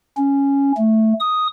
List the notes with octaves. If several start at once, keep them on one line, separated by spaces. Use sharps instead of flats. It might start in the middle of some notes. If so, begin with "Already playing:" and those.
C#4
A3
D#6